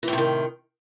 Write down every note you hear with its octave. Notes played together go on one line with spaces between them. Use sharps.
A2 C3 D#3 E3